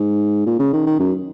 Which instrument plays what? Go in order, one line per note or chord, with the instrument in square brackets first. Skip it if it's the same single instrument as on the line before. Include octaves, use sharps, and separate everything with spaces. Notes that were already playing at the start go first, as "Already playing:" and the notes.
Already playing: [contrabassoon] G#2
A#2
C#3
D#3
D#3
F#2